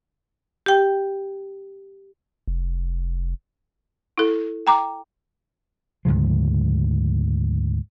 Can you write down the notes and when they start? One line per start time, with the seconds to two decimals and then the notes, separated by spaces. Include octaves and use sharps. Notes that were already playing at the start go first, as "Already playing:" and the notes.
0.66 G4 G5
2.48 F1
4.18 E4 A4
4.67 G5 A#5 D6
6.05 D2 G#2 C#3 F3